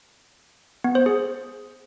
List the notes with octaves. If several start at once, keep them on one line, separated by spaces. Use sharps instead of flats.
B3
C5
G#4